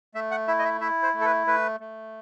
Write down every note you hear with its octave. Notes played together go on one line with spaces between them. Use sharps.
A3 E5
F#5
E4 E5
D#5
E5
E4 E5
C5
A3
A4
B4
A3 B4
A3